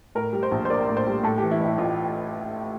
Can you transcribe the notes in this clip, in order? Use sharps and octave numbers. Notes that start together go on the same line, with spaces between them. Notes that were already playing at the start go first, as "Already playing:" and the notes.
A2 A#4
G3
C5
A#1
C5
A#3 D5
A2
C5
G3
A2 A4
E3 G4
E4
A1
E4
A1 F4